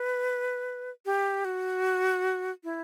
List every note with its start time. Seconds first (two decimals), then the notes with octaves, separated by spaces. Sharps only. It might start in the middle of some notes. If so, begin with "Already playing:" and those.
Already playing: B4
1.06 G4
1.45 F#4
2.64 E4